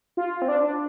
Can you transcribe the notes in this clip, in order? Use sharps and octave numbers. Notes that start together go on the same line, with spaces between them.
F4
C4
D4
D4